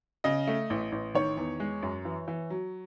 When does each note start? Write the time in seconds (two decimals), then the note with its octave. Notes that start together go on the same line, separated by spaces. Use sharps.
0.24 C#3 D#5
0.47 A3
0.70 A1
0.92 A1
1.15 D#3 C#5
1.37 E2
1.60 G#3
1.83 F#2
2.05 E3
2.28 E3
2.50 F#3